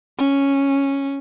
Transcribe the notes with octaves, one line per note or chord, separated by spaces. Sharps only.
C#4